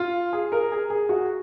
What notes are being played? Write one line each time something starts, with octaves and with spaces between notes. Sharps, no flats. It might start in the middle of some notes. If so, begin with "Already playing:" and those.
Already playing: F4
G#4
A#4
G#4
G#4
F#4